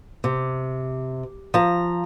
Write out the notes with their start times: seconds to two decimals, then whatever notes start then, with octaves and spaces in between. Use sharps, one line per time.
0.24 C3
1.54 F3 A#5